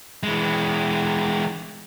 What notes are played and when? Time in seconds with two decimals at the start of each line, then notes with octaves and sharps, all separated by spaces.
0.23 E3 G#3